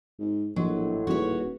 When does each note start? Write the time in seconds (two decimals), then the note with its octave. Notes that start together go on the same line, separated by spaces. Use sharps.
0.19 G#2
0.56 A#1 A2 F#3 D#5 C6
1.07 D#1 F#4 G#4 B4 C#5